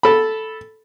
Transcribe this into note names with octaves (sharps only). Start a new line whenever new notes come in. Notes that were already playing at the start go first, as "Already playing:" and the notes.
A4 B5